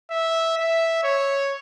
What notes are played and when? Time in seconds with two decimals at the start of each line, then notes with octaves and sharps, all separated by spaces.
0.11 E5
0.58 E5
1.03 C#5